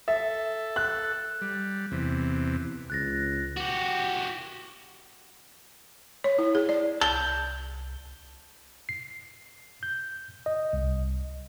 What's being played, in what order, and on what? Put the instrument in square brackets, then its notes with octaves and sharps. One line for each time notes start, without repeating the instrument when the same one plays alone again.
[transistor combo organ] A4 [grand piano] E5
[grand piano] F#6
[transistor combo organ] G3
E2 C3
[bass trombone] C#2 [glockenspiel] F#6 A6 A#6
[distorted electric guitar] F#4 G4
[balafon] C#5
E4
G#4
D5
[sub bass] C2 [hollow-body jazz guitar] A5 [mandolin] G6
[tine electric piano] C7
G6
D#5
C2